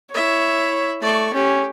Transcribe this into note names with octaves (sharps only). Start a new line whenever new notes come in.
E4 C#5 E5
A3 D5 C#6
C#4 G4